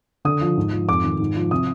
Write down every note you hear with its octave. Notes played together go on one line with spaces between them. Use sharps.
D3 D#6
F3
G#2
F3
F2 D6
D#3
G#2
F3
C3 D#6